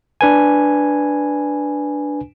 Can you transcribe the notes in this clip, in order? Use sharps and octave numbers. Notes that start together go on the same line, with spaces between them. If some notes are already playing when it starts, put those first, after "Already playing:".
D4 B4 G#5